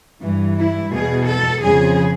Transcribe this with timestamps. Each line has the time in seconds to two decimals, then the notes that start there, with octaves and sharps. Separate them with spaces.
0.22 G2 E3
0.57 E4
0.92 E2 B2 G#4
1.27 A4
1.61 F2 C#3 F3 G#4